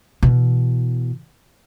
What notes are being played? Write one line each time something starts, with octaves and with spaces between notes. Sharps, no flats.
B2 E3